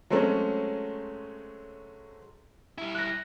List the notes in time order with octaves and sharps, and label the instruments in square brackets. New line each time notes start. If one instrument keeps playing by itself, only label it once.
[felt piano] F#3 G#3 A3 C4 C#4
[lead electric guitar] G3 E4
[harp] F#6 A#6